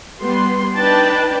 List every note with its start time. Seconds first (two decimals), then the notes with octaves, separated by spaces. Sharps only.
0.23 G3 B3 C6
0.75 D4 D#4 B4 D5 G5 A5